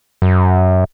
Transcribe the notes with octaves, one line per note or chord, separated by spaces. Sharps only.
F#2